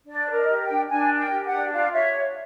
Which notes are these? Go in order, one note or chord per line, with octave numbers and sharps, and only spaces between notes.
D4 D5
A#4
D#5
G4
G5
D4
D4 G#5
A#4
G5
G4
F#5
D4
F4 F5
C#5 E5